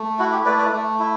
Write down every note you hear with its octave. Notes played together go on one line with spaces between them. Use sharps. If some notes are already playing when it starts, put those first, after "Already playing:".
Already playing: A3
E4 F#4
G4
A3 B4 D5
B4 D5
A3
E4